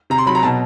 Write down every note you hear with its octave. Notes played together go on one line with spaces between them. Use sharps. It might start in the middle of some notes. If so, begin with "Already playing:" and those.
C3 A#5
C6
F#3 B5
A#5
B2 A5